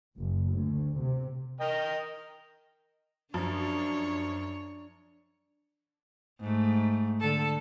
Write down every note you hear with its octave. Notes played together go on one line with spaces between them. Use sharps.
F#1
D2
C3
A#4 D#5 G5
F#2 F3 D4 C#5
G#2 A3
D3 A4